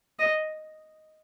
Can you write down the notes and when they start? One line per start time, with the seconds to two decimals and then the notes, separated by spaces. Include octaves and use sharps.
0.19 D#5